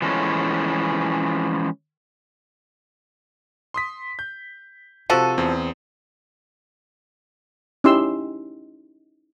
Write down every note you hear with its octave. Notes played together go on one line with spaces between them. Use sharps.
E3 F3 G#3 C#4 A4
C6 D#6 B6
G6
C3 F3 F#4 A4 D#7
E2 C4
C#4 D#4 E4 G4 C6 E6